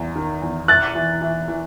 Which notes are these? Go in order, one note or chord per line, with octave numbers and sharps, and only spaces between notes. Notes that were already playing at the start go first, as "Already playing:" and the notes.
Already playing: E2
D#3
E2
E4 F#6 A6
E3
E3
E3